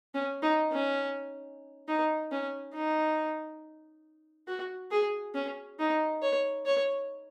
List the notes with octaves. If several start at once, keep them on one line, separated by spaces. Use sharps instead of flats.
C#4
D#4
C#4
D#4
C#4
D#4
F#4
G#4
C#4
D#4
C#5
C#5